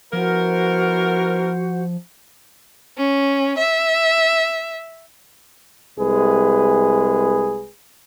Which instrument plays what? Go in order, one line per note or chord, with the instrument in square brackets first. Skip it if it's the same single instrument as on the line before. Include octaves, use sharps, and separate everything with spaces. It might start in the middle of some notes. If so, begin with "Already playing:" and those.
[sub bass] F3 [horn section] B3 E4 A#4 [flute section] F#4 C5 F#5
[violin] C#4
E5
[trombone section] C2 G#3 G#4 B4